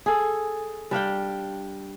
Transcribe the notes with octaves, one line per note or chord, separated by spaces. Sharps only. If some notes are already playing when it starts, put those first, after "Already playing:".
G#4 A4
G3 D4 F5 G5